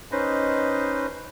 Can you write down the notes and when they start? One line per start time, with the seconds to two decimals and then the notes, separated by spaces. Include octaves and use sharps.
0.12 C#4 D#4 B4 C5 D#5